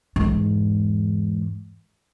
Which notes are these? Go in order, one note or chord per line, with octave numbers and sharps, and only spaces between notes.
E2 G#2